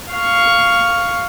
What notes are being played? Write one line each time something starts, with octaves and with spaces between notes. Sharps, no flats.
F5 C#6